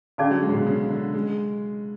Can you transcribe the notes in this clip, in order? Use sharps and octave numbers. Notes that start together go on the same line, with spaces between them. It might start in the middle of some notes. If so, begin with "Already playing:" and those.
D3 C#4 G#4 D5 F5 A5
F#3
G#3
C#3
B2
C#3
D3
G#3